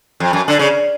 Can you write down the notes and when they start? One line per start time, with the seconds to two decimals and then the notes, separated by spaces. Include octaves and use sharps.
0.20 F2
0.33 F#2
0.48 D3
0.59 C#3